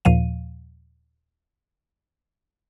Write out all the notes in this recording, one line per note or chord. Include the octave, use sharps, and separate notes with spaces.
D#2 A#2 F3 F5 D#7